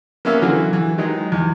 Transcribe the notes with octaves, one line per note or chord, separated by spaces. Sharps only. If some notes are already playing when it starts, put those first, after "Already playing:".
A#3 B3 C#4 E5 F5
D3 E3 F#3 F#4
E3
D#3 F#3 G#3 D#4
E2